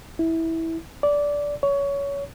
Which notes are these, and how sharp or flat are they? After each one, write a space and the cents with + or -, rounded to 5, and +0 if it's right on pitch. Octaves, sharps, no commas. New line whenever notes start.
E4 -15
D5 -15
C#5 +20